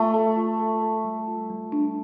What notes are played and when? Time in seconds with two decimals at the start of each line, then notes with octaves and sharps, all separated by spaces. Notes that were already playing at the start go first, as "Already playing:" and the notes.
Already playing: A3 F4
0.14 A4
0.37 F4
0.60 A4
0.82 A4
1.05 G3
1.28 F4
1.50 G3
1.72 D4